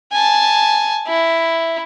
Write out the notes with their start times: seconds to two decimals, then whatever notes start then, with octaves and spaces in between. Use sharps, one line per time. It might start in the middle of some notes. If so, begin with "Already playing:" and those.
0.12 G#5 A5
1.07 E4